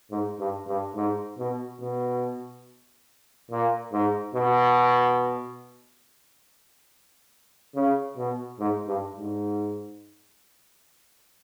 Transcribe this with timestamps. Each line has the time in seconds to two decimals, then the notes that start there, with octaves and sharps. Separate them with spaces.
0.11 G#2
0.39 G2
0.67 G2
0.95 G#2
1.38 B2
1.81 B2
3.51 A#2
3.92 G#2
4.35 B2
7.75 C#3
8.17 B2
8.59 G#2
8.87 G2
9.17 G#2